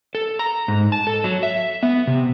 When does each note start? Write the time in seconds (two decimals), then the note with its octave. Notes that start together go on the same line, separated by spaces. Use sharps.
0.15 A4
0.39 A#5
0.68 G#2
0.92 A5
1.07 A4
1.24 F#3
1.43 E5
1.83 B3
2.07 C3